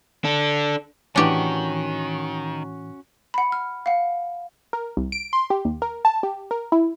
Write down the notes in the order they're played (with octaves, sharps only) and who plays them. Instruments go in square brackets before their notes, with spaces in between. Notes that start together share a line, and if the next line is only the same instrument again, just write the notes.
[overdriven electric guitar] D4 A4
[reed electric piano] A2 E3 [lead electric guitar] D#3 [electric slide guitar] C#4 F#4 [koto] D4 G4
[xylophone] F#5 B5
F6
F5 F#5
[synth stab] A#4
C2
D7
C6
G4
D#2
A#4
A5
G4
A#4
E4